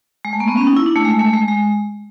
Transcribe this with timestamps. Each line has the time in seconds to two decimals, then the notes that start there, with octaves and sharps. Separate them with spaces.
0.25 G#3
0.33 A3
0.40 A#3
0.48 B3
0.57 C#4
0.67 D#4
0.77 E4
0.86 D4
0.96 A3
1.05 G#3
1.19 A3
1.33 G#3
1.48 G#3